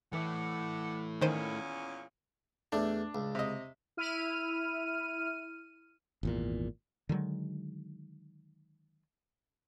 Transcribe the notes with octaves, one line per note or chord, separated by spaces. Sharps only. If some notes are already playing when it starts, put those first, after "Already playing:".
A2 E3 A3 E4 D5 F#5
E2 A#2 D#3 C#4 C5 D#7
E2 A3 D4
C#2
C3 D#5
E4 F6 D#7
G#1 E2 A#2
D3 D#3 F#3 G#3